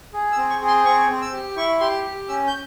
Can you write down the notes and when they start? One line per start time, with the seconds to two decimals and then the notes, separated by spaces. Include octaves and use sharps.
0.13 G#4
0.32 E6
0.37 C4
0.50 C#6
0.62 G#4
0.67 C6
0.85 C4 C#6
1.10 C4
1.22 E6
1.33 G4
1.56 E4 C#6
1.80 G4 C6
2.05 G4
2.28 C#4 E6
2.47 G6